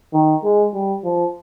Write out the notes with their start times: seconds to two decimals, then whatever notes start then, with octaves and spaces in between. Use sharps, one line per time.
0.13 D#3
0.44 G#3
0.74 G3
1.04 F3